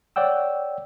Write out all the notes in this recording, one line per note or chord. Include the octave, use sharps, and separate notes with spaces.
C#5 D5 F#5 G5 E6